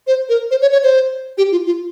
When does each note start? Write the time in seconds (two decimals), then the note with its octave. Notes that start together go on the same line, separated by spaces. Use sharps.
0.07 C5
0.29 A#4
0.51 C5
0.61 C#5
0.72 C#5
0.83 C5
1.38 G4
1.52 F4
1.66 F4